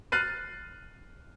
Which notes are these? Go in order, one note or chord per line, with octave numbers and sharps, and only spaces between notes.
F6 F#6 A6 C7 D#7